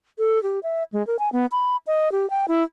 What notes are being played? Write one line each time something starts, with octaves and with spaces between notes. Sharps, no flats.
A4
G4
E5
G#3
A#4
G#5
B3
B5
D#5
G4
G5
E4